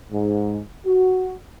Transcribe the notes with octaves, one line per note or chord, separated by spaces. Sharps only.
G#2
F#4